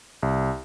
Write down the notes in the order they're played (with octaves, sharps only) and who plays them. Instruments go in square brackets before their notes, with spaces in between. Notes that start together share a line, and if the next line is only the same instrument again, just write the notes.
[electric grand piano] C2